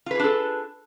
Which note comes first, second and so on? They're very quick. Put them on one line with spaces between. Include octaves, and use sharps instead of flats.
F4 B4 G#4 D4 A4